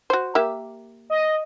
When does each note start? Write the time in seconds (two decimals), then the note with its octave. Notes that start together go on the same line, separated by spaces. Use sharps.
0.10 F#4 C5
0.35 A#3 G4 E5
1.10 D#5